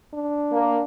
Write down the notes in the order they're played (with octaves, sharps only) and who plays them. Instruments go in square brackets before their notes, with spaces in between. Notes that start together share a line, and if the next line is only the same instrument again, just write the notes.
[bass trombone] D4
[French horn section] A#3